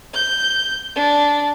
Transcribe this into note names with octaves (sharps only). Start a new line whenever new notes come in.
G6
D4